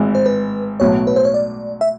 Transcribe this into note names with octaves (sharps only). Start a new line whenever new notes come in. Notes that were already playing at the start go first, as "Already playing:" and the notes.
Already playing: G#1 G#2 E3
C5
B4
B1 A2 F#3 C#5
B4
C5
C#5
D5
E5